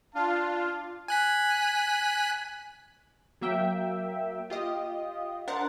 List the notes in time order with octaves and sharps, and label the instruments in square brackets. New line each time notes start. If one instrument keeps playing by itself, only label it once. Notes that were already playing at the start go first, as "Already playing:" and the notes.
[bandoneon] D4 [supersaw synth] F4 [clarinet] F5 [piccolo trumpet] A5
[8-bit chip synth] G#5 F#6 B6
[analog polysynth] F#3 A#3 E5 G5
F4 G4 D#5
D4 A#4 C5 F#5 A6